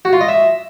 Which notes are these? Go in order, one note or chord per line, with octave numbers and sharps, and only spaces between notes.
F#4
F4
D#5
E5